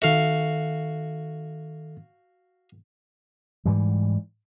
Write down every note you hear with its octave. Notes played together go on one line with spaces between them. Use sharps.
D#3 F#4 A4 E5 F5
G#2 E3 G3